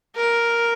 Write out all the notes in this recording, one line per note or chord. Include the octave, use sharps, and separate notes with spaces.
A#4